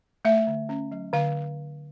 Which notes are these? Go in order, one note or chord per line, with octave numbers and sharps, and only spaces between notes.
A3 E5
D3
C#4
F#3
D3 F5